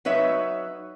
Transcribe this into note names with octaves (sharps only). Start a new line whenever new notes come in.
F#3 D#4 B4 C#5 E5